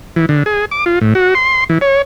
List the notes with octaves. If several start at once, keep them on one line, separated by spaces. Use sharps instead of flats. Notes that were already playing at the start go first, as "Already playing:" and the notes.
E3
D3
G#4
D6
F4
A2
F#4
C6
E3
C#5